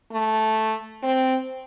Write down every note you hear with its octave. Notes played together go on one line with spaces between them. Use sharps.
A3
C4